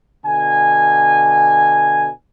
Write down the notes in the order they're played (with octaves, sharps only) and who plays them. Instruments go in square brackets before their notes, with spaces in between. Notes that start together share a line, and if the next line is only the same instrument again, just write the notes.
[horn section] B2 D3 G#5